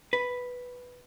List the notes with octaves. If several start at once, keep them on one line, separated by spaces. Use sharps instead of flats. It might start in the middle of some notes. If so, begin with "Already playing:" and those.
B4